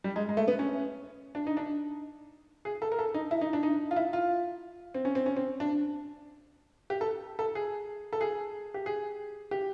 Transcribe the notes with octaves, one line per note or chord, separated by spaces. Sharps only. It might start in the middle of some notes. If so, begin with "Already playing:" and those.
G3
G#3
G#3
A3
B3
C#4
D4
D#4
D4
G#4
A4
A#4
A4
D#4
E4
D#4
D4
D#4
F4
E4
F4
C4
C#4
C4
C#4
C4
D4
G4
A4
A4
G#4
A4
G#4
G4
G#4
G4